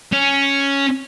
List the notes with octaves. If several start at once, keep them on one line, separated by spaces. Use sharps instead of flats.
C#4